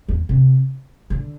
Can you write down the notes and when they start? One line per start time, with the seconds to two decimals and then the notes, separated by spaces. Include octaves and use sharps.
0.09 E2
0.29 C3
1.10 D3